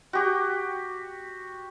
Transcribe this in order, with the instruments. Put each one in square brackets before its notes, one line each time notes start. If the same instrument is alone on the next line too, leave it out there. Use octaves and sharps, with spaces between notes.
[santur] F#4 G4